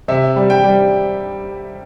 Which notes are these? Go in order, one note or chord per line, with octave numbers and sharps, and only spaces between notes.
C3 E5
G3
G5
G3